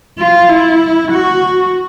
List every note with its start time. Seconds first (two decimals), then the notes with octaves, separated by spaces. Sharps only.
0.19 F4
0.49 E4
1.11 F#4